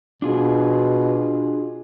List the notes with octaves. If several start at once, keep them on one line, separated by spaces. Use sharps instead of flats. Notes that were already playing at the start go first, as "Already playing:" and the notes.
B2 D4 F4 G#4